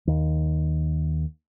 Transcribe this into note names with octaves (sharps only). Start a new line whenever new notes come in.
D#2